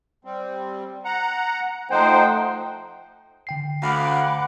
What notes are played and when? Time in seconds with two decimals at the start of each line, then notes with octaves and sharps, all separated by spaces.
0.25 G3 C4
1.05 F#5 A#5
1.91 F3 A3 D#4 C5 F#5 G5
3.47 D3 G5 C7
3.83 D2 F5 F#5 B5 D6 F#6